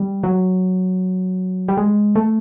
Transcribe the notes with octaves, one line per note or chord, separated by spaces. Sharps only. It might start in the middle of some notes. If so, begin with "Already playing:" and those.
Already playing: G3
F#3
G3
G#3
A3